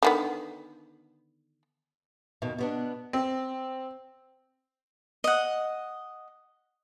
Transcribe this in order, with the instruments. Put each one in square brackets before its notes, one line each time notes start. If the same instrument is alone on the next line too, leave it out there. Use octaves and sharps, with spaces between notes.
[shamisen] D3 D#3 B3
[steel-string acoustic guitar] F2 B2 D#3
B2 B3 D4
[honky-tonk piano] C4
[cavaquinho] D#5 F#5